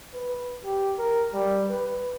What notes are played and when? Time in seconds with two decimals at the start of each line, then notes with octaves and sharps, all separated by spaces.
0.14 B4
0.64 G4
0.98 A#4
1.33 G3
1.68 B4